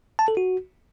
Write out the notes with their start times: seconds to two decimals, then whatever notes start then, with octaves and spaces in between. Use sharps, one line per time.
0.19 A5
0.28 A4
0.37 F#4